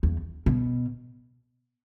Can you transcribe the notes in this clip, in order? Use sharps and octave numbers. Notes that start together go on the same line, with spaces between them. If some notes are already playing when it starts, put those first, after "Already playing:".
E2
B2